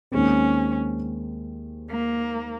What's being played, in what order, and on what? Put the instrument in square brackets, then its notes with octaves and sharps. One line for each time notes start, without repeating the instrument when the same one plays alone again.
[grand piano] D#2 D#3 G#3 C4 [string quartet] C#4
[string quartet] A#3